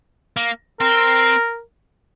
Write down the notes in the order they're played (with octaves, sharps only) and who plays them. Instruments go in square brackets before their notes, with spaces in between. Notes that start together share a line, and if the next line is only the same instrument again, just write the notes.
[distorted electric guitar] A#3
[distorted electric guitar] C4 [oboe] A#4